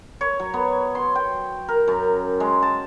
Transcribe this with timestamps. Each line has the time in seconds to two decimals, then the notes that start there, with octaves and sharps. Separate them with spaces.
0.21 C#5
0.40 F#3
0.54 B3
0.95 C6
1.15 G5
1.68 A#4
1.88 F#2
2.40 G#3
2.62 A5